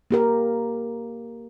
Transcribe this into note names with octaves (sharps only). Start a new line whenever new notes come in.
A#3 G4 A#4